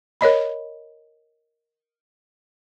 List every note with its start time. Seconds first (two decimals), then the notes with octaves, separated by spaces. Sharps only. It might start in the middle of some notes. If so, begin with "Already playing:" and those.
0.21 A#4 C#5 D#5 B5